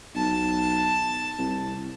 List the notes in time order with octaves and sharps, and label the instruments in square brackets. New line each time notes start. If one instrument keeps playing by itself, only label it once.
[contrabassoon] B1 [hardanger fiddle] A5
[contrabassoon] C2